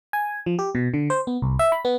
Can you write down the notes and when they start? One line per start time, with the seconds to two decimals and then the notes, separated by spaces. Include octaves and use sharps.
0.13 G#5
0.46 F3
0.59 G4
0.75 B2
0.94 D3
1.10 C5
1.27 B3
1.42 C2
1.59 E5
1.72 B5
1.85 B3